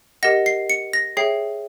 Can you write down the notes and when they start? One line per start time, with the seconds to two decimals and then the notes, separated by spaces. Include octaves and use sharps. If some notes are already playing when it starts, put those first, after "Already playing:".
0.23 G4 A#4 D#5 F#5 A#6
0.46 C7
0.70 C#7
0.93 A#6
1.17 G#4 C#5 E5 G5 C7